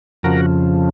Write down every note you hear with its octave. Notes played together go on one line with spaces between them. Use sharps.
F2 C#3 F3 F#4 A#4